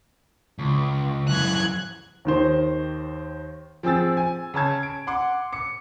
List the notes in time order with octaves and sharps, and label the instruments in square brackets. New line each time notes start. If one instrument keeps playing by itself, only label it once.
[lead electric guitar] C#2
[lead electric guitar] F#2 E3 [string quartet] F#6 G#6
[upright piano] D#2 D#3 C5
F3 C4 G#4 E6 A6
G#5
C#3 C#5 A5 G#6
D7
F#5 C6 D6
D6 C#7